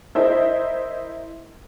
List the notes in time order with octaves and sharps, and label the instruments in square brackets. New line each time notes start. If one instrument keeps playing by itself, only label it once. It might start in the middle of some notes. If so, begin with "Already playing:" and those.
[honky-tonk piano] E4 A#4 C5 D#5 E5